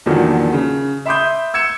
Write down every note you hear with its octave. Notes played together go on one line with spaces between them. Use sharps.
E2 A#2 D3 D#3 F3 F#3
C#3
E5 B5 C6 D6 D#6 G6
E6 G#6 C#7 E7